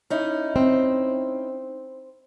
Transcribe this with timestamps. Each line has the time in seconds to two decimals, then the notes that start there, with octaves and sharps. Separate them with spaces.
0.10 C#4 D#4 E4
0.56 C4